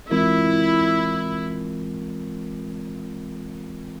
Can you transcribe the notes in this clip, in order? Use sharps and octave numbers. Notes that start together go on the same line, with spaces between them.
E3 G#3 C4 E4 F4 A#4